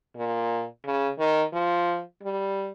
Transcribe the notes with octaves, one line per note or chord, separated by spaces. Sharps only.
A#2
C#3
D#3
F3
G3